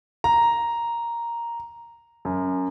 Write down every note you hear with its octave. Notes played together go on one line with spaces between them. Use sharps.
A#5
F#2